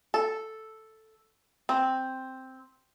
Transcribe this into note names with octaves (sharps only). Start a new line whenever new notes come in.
A4
C4